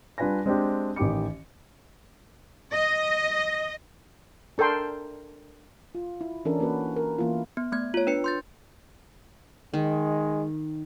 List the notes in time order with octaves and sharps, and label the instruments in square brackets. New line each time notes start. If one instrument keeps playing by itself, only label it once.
[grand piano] G3 D4 F4 B4 G#5 A#6
G#3 C4 D4 G4
A1 D#3 G4 D6 C#7
[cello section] D#5
[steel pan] D4 A4 A#4 G5 C6
[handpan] F4
E4
E3 C#4 D4 A4 A#4
A#3 C#4 F#4 B4
A#4
E3 A#3 B3 E4 F4
[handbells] B3
A3 B3 G#6
F4 C#5
D4 B4 C#7
C6 G6 A6
[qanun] D#3 [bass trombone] G#3